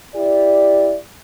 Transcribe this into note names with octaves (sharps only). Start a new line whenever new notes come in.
E4 G4 D5